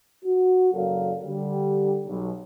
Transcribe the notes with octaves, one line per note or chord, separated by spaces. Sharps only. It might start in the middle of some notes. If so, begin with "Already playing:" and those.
F#4
F#1 F#3 A4 A#4 D5 F5
D3 G3 G4
B1